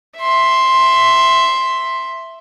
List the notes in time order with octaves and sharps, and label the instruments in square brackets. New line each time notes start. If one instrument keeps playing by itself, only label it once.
[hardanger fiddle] E5 C6